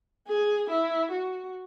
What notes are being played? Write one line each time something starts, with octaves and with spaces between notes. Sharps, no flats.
G#4
E4
F#4